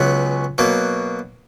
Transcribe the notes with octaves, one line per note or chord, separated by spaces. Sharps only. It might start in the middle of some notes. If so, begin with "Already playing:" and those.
Already playing: C#2 C#3 F#3 B3
B2 F#3 A#3